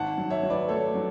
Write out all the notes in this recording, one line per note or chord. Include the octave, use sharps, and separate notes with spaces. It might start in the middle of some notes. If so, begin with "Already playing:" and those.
Already playing: G#1 F#5 A5
F#3
C#5 E5
F#3
B4 D5
A3 A4 C#5
F#3